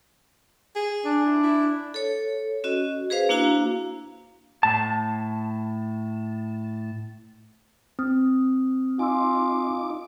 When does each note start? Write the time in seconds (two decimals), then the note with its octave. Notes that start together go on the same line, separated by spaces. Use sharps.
0.76 G#4
1.05 D4
1.26 E4
1.43 E4
1.94 A4 C#5
2.64 C#4 F#4 D#5
3.10 G#4 B4 C5 F5
3.29 A#3 D4 E4 F#4 F5 A#5
4.63 A2 A5
7.99 C4 D#6 F6
8.99 D#4 F4 G#5 C6 D6 E6